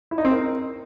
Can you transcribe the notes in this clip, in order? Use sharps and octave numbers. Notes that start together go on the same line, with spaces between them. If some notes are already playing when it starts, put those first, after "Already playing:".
E4
D#4
C4
A#4